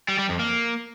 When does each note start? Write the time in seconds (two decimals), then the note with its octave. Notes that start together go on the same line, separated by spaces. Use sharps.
0.08 G3
0.19 G3
0.29 F2
0.39 A#3